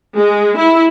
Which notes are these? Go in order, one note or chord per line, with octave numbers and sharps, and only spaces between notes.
G#3
E4